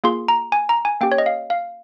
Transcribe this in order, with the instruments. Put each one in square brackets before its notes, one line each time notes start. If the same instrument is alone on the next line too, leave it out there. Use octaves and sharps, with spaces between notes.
[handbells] A#3 F4 G#4 C6
A#5
G#5
A#5
G#5
A#3 C#4 G4 G5
C#5
D#5
F5
F5